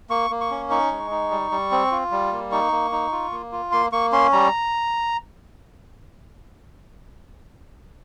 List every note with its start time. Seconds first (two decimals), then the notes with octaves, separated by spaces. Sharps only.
0.10 A#3 C#6
0.30 A#3
0.41 C#6
0.51 C#4
0.70 D#4 C#6
0.91 G#3
1.11 D#4
1.31 G3
1.51 G3
1.71 C4
1.92 F4
2.11 G3
2.32 A#3
2.52 D#4 C#6
2.72 A#3
2.92 D#4
3.12 F4
3.32 A#3
3.52 F4
3.72 A#3 C6
3.92 A#3 C#6
4.12 C#4 C6
4.32 G3 A#5